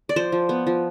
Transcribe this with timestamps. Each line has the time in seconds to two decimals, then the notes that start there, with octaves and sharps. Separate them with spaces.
0.09 D5
0.16 F3 C5
0.32 F3
0.49 B3
0.67 F3